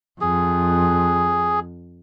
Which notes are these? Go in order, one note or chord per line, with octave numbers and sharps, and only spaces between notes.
F2 G#4